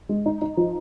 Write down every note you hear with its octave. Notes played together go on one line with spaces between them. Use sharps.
G#3
D#4
D#4
F3